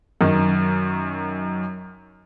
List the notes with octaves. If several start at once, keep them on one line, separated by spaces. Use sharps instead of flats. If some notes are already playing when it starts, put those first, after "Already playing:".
F#2 D#3